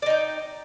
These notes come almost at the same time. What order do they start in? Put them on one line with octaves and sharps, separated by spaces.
D5 D#4 G5